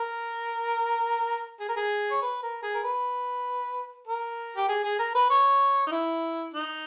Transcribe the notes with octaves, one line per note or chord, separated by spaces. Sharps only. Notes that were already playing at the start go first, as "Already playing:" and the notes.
Already playing: A#4
G#4
A#4
G#4
C#5
B4
A#4
G#4
A#4
B4
A#4
G4
G#4
G#4
A#4
B4
C#5
D#4
E4
D#4